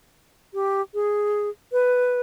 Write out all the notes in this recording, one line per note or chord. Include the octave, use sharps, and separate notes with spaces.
G4
G#4
B4